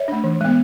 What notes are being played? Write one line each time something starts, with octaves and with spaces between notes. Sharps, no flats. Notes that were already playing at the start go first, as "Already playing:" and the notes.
Already playing: C#5 E5
A3 D4
E3
G#3 B3